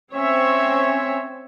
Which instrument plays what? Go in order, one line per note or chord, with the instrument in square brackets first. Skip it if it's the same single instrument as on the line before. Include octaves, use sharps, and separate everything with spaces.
[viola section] C4 C#5 E5 [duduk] C#4